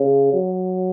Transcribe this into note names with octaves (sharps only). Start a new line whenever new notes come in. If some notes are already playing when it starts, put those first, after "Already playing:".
Already playing: C#3
F#3